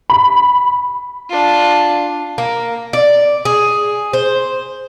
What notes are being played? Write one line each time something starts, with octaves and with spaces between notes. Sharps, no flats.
B5
D4 F4
A#3
D5
G#4
C5